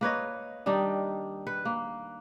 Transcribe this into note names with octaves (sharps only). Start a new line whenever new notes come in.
A#3 B4 C#5 D#5
D#3 G3 D4 D#4
B4
A#3